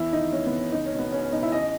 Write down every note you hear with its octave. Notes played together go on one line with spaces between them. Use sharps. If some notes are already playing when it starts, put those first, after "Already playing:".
Already playing: E2 E4
D#3 D#4
E2 C#4
B3
E2
C#4
C#2 D#4
C#4
B2
B3
C#2 C#4
C#4
B2 D#4
E4
A1 D#5